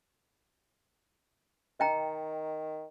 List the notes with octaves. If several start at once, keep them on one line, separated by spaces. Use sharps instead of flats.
D#3 D#5 G5 A#5